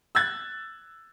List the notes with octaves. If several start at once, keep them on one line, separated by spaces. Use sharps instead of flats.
E6 F#6 G#6 A6